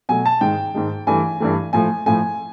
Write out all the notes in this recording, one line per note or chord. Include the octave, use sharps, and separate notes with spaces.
B2 F#3 A3 G#5
A5
G#2 D#3 G#3 G5
G#2 D#3 G#3
G2 E3 A3 G#5
G2 E3 A3
A2 F3 A3 G#5
A2 F3 A3 G#5